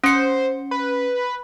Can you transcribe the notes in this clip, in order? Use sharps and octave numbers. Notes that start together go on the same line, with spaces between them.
C#4 C5 C#7
B4